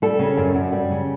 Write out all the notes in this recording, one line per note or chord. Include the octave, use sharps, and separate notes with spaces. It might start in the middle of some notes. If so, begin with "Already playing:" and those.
G3 A4
C#3
F#2
F#2
G3
C#3